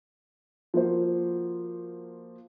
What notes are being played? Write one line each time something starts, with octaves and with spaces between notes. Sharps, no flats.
F3 A#3 F#4 C5